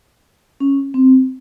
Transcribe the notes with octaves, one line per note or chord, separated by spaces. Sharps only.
C#4
C4